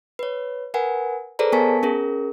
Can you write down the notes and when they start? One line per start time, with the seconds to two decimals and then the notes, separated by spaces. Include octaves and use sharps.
0.19 B4 C#5
0.74 A#4 B4 F#5 G#5
1.39 G#4 A4 B4 C5 D5 A#5
1.52 B3 A#4 G#5 A5 C#6 B6
1.83 C#4 G#4 A#4